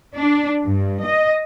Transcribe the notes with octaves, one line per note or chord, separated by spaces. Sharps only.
D4
G2
D#5